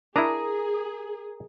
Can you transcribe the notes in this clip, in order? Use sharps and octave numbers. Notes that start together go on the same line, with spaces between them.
D4 E4 G#4 A#4 A#5 D#6